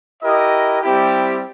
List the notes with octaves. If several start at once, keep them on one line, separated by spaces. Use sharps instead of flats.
E4 G4 A#4 D#5
G3 C4 E4 G4